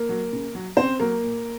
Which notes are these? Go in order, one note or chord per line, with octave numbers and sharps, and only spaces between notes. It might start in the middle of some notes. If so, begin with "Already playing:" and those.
Already playing: A#3 A#4
F#3
C#3
F#3
C#3 C4 C5
F#3 A#3 A#4
A#2